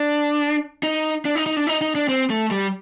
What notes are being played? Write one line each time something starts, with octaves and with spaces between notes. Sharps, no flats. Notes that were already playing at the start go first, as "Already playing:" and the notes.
Already playing: D4
D#4
D4
D#4
D#4
D4
D#4
D#4
D4
C4
A3
G3